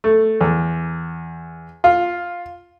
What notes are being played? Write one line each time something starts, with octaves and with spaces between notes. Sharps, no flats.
A3
E2
F4